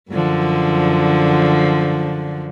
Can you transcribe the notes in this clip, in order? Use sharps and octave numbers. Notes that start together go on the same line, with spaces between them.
F#2 D3 F3